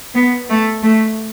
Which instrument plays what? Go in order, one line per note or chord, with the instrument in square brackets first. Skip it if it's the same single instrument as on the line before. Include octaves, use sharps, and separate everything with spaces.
[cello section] B3
A3
A3